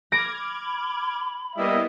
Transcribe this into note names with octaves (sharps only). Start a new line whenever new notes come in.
B5 D6 F6 G#6 A#6 D7
G3 A#3 B3 E4 D#5 E5